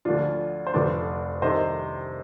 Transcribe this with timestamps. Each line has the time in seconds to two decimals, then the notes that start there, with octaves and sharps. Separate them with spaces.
0.05 D2 D3 F3 D4 F4
0.67 C5
0.74 F1 F2 D3 B4 D5
1.41 C2 C3 D#3 C5 D#5